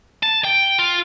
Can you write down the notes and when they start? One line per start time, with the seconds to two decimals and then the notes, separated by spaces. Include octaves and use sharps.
0.23 A5
0.45 G5
0.79 F4